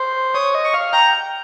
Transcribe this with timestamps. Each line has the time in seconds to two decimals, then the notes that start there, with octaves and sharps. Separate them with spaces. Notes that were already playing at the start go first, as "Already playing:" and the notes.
Already playing: C5
0.34 C#5 D#6
0.54 D#5
0.64 C#6
0.74 F5
0.93 G5 A#5